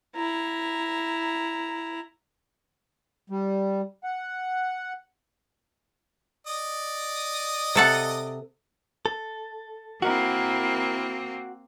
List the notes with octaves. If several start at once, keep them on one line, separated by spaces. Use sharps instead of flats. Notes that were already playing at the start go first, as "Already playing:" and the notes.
E4 A#5
G3
F#5
D5 D#5 D#6
C3 A4 F#5
A4
A#3 C4 E4 F#4 A#4